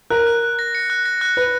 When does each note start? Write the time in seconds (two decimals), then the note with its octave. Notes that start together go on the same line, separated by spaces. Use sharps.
0.10 A#4 F#6
0.27 F#6
0.43 F#6
0.59 A#6
0.75 C#7
0.90 F#6
1.05 A#6
1.21 F#6
1.37 B4 F#6